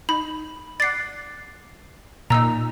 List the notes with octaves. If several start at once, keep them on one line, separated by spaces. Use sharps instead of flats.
D#4 B5
D5 F#5 A6 C7
A#2 D#4 A#5 E6